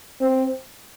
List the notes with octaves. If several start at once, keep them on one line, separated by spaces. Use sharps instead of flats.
C4